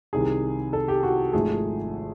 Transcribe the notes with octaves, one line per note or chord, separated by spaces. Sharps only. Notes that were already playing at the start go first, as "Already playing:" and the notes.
C2 C3 D#3 G#4
A4
G4
F#4
G#1 G#2 F3 A3 G#4